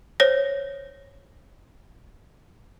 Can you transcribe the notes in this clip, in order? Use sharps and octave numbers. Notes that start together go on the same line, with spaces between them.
C5 C#5 A#6